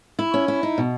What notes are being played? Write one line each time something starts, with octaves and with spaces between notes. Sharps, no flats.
E4
C#4
E4
D#4
B2